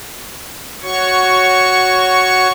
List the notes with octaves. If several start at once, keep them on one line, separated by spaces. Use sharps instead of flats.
F#4 C#5 C#6